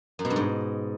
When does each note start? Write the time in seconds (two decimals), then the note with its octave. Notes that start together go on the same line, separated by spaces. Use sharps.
0.19 F#2
0.25 B2
0.30 G2
0.36 G#2